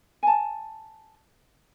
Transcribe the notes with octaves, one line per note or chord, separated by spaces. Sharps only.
G#5 A5